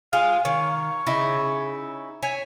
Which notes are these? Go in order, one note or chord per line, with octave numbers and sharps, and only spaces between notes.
G#3 F4 G#4 F5
D#3 C#5
C#3 D#4 E4
C#5 E5 G#5